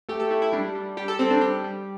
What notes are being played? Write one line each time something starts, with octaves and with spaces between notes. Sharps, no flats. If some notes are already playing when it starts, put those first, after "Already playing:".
A3 G4
A4
A3 E4
E4
G3 D4
G3
G3 G4
A4
G3 C4
D4
G3 G4
G3